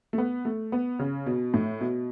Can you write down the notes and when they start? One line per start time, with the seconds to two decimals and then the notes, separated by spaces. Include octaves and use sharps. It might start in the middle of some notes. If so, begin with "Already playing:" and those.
0.13 A3
0.18 B3
0.45 A3
0.72 B3
0.99 C#3
1.26 B2
1.54 A2
1.81 B2